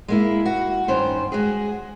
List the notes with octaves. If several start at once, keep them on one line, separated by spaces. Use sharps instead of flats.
G#3 A#3 E4
F#4
G2 D#3 C#4 C5
G#3 F#4 G#4